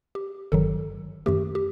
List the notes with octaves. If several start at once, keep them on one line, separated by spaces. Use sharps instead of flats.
G4
G1 G2 D#3 F#3 A4
F#2 D#3 A3 G4
G4